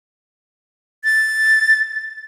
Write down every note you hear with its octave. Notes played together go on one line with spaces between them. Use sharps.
A6